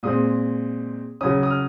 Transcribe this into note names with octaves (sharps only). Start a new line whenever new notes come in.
A#2 G#3 C4 D#6
C#3 F#3 C#4 D#6
D#6
F6